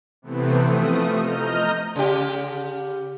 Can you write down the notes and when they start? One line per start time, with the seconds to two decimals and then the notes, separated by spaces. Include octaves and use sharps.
0.22 C3 E3 A3 B3 C4
0.62 F3 A3 D#6
1.18 D#5 A#5 F6 G6
1.96 C#3 G4